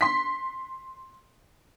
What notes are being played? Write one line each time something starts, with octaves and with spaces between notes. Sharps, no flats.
C6 B6